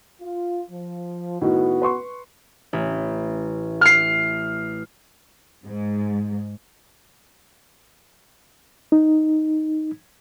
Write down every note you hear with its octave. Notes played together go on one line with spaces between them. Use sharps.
F4
F3
A2 D#3 B3 F#4
B4 C6 C#6
A1
F6 C7
G#2
D#4